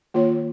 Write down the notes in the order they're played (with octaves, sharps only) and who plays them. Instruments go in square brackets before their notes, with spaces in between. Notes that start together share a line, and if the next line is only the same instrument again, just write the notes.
[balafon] D#3 A#3 F4 C#5